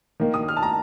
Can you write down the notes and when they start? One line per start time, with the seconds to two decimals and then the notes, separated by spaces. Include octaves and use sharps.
0.20 D#3 A#3
0.34 D#6
0.48 F6
0.57 A5
0.63 A#5